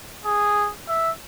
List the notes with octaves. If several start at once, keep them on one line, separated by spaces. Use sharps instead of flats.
G#4
E5